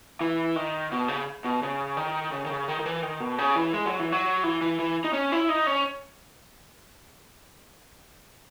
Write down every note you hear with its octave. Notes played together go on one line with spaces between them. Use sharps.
E3
D#3
B2
C#3
B2
C#3
D#3
C#3
D#3
C#3
D#3
D#3
E3
D#3
B2
C#3
E3
G#3
F#3
E3
F#3
E3
E3
E3
D#4
C#4
E4
D#4
C#4